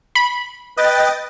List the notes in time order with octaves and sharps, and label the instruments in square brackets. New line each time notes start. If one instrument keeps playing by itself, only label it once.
[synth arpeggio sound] B5
[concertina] B4 [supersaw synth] D#5 G5 A6